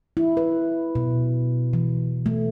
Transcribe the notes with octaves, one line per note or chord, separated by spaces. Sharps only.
E4
B4
B2
E3
A3